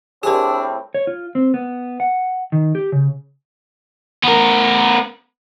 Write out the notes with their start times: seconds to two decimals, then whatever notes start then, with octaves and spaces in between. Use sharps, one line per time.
0.23 A2 G3 C4 D4 G4 G#4 A#4
0.94 C#5
1.07 F4
1.35 C4
1.54 B3
2.00 F#5
2.52 D#3
2.75 G4
2.92 C#3
4.24 B3 A#4